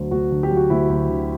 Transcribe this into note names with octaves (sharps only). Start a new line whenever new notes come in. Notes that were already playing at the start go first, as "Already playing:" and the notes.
Already playing: D2 D3 F#3
D2 F#4
D3
G4
F#3
F#4
D2 E4
D2
D3